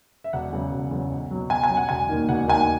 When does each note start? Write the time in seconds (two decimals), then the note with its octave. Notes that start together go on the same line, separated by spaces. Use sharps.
0.24 E5
0.33 E1 F#5
0.52 E2 C#3 F#3
0.71 E1
0.91 E2 C#3 F#3
1.11 B1
1.31 B2 F#3
1.50 B1 G#5
1.64 G#5
1.69 B2 F#3
1.77 F#5
1.89 E1 G#5
2.09 D#2 D#3
2.29 E1 F#5
2.48 D#2 D#3 G#5
2.59 F#5